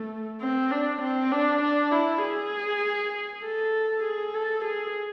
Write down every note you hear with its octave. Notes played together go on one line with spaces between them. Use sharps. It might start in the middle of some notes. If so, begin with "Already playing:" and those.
Already playing: A3
C4
D4
C4
D4
D4
E4
G#4
A4
G#4
A4
G#4